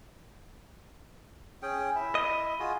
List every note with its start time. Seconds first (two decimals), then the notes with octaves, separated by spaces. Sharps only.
1.62 C#4 G#4 G5
1.96 E4 E5
2.15 D#5
2.59 F4 F#4 G#4